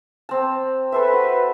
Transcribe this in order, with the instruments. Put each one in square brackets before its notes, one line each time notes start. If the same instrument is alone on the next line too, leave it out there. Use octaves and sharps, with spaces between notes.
[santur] C4 A5
[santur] A4 C5 E5 [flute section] B4
[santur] F#4